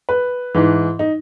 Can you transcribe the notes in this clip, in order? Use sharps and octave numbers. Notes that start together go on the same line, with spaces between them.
B4
G#2 E3
D#4